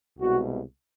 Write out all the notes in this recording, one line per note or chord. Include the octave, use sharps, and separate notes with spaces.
C2 B2 G#3 F#4